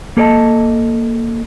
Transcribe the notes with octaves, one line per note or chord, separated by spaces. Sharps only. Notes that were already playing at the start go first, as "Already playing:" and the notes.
A#3 A4 A#4 D5 D#5 A5